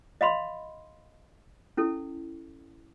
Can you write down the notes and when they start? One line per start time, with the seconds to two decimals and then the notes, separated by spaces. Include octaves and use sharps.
0.21 D#5 F5 B5 C6
1.77 C#4 E4 A4